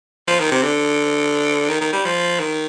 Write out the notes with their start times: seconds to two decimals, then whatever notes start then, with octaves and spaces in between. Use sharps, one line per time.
0.27 F3
0.40 D#3
0.51 C3
0.63 D3
1.69 D#3
1.81 D#3
1.93 G3
2.05 F3
2.40 D#3